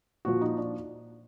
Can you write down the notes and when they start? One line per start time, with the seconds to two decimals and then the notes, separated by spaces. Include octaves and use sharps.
0.25 A#2 F3 F#4
0.41 D#4
0.57 D4